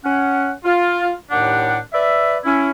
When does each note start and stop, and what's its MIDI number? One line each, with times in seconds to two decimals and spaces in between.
0.04 0.51 61
0.04 0.51 78
0.64 1.12 65
1.31 1.79 39
1.31 1.79 45
1.31 1.79 62
1.31 1.79 67
1.31 1.79 78
1.92 2.38 71
1.92 2.38 74
1.92 2.38 76
2.44 2.70 61
2.44 2.70 64